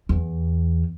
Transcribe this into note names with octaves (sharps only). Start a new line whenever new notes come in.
E2